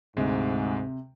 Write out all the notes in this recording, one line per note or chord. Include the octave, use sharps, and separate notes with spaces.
D2 G#2 C3 G#3